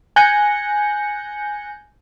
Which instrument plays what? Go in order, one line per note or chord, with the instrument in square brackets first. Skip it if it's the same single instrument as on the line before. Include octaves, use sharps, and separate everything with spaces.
[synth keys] G#5 F#6 G6 A#6 C#7